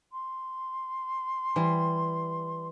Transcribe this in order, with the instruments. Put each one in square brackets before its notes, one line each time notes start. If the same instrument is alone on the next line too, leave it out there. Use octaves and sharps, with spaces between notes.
[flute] C6
[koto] E3 G3